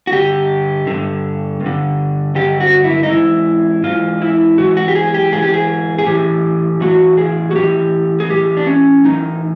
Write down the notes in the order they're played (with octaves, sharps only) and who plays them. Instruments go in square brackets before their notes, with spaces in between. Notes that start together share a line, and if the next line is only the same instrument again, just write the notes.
[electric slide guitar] F#4
G2 D3 G4
G2 D3
G2
D3
G2 D3 G4
F#4
E4
D#4
G#2 E3 E4
G#2 E3 F4
E4
G#2 E3 F#4
F#4
G4
G#4
G4
G#2 E3 G#4
G4
G#4
G#4
A2 E3 G4
A2 E3 F#4
G#4
F#4
A2 E3 G4
G#4
A2 E3 G4
D4
C#4
A2 E3 D#4